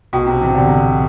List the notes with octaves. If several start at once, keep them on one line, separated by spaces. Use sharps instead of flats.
B1 B2
C3
A2 C3 E3 B3
D3
B1 C3